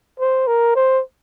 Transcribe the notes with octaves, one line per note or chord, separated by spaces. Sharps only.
C5
A#4
C5